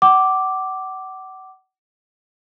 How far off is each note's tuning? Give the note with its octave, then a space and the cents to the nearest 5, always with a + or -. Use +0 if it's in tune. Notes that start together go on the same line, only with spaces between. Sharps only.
F#5 +30 D6 +0